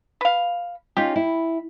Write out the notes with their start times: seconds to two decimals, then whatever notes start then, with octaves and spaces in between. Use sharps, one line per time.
0.21 B4 F5
0.97 C#4 D#4 F4 G4
1.16 E4